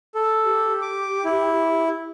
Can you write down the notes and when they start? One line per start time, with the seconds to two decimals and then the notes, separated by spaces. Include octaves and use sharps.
0.15 A4
0.45 G4
0.82 D6
1.25 E4